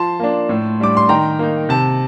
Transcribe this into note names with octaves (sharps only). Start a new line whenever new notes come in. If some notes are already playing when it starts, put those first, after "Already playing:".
Already playing: F3 A5 C6
A#3 D4
A2
G3 D4 D6
C6
D#3 G5 A#5
A#3 D#4
C3 A5